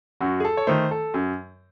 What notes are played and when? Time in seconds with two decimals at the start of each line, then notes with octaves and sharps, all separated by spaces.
0.21 F#2 F#4
0.40 G#4
0.45 A4
0.57 C#5
0.67 D#3 A3 C5
0.91 A4
1.14 F#2